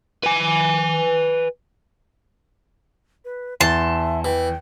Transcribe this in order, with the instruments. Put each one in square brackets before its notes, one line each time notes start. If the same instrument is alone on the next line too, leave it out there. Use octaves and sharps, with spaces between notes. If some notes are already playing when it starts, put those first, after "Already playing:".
[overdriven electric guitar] B4 G#5
[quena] B4
[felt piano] E2 [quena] E5 [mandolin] A5 C6
[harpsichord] E3 [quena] G5